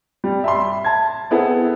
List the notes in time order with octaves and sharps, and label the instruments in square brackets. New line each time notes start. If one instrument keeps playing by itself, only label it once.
[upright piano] G3
E5 B5 C6
A5 G#6
B3 C4 E4 G#4 A4 F#5